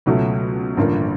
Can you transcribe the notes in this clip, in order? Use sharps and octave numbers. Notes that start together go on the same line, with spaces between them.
C#2 B2 F#3 A3
A1 G2 D3 F3 A#3